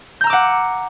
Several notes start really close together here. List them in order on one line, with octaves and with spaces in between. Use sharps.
G6 A#5 E6 D6 F#5